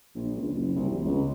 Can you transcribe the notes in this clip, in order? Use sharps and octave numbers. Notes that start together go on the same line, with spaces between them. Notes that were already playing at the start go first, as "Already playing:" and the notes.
A#1
C#2
F#1
C2
E1
C#2